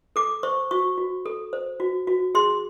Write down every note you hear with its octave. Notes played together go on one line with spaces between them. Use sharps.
A4 D6
C5 C#6
F#4 C#6
F#4
A4
C5
F#4
F#4
G#4 C6